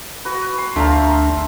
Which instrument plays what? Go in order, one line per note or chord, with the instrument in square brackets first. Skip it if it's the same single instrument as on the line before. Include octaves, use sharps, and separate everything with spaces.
[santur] F#4 B4
C6
[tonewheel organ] D2 D4 [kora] A3 [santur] C4 F5 A#5